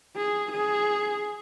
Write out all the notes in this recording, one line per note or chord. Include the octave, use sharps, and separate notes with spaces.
G#4
G#4